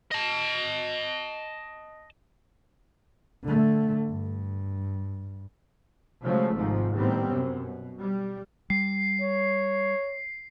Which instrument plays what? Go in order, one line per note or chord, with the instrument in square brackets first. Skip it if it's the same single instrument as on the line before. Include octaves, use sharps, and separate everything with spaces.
[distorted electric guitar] D#5 A5
[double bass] D3 A3
G2
[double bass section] C#3 F3 F#3 G#3 A3
G#1 G#2 C3 F3
A2 D#3 G3 B3 C4
F#2 C3
B2
G3
[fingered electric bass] G3 [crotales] C7
[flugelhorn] C#5